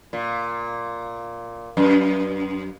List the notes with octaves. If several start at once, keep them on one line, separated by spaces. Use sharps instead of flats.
A#2
F#2